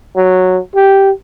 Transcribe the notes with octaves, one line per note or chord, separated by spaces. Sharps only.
F#3
G4